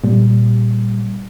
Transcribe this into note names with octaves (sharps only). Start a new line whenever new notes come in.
A#2 G3